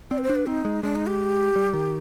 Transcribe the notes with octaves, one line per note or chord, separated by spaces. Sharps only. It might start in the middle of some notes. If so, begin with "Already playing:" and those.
C4 D5
B4
C5
D4
B4
C4 D#4
G#3
G#3 D4
D#4
G4
G3
D#3